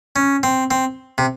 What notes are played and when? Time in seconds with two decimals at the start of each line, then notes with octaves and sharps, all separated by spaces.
0.16 C#4
0.43 C4
0.71 C4
1.18 C3